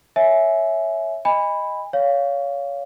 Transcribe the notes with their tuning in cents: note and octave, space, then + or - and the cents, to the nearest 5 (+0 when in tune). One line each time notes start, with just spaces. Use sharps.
C#5 +0 E5 -5 G#5 +15
D#5 +0 G#5 -40 B5 +0
C#5 +25 F5 +0